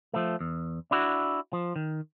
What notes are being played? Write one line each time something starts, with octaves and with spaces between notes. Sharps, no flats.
F3 A3
E2
D4 E4 F#4
F3
D#3